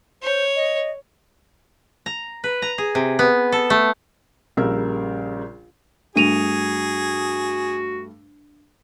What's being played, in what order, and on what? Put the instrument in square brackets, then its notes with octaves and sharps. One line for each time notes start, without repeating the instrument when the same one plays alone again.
[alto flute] C5 [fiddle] C#5
[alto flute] D#5
[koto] A#5
B4
A#5
G#4
C3
B3
A4
A3
[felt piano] A#1 C#3 G3 A#4 E6
[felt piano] G2 A3 [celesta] D4 D#7 F7 [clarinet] F#4 [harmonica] G#4